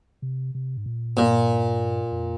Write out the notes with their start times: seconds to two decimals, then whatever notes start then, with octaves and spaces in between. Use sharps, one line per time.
0.22 C3
0.55 C3
0.77 G#2
0.86 A#2
1.17 G2 A#2
2.11 F2